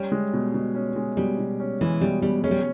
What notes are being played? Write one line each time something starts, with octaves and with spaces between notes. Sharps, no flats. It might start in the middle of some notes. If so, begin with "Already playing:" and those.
Already playing: G3 C#4
G#3
B2
B2
C#4
G#3
B2 G3
B2
C#4
E3 G#3
B2 G3
B2 G3
G#3 C#4
G3